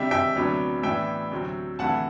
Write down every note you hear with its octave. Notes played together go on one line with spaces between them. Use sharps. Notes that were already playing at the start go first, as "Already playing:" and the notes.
Already playing: C3 G3 D4 E5 G5
E5 G5
D2 C3 F#3 B3 D4
A2 E3 B3 D4 E5 G5
D2 C3 F#3 C4
D2 C3 E3 A3 F#5 A5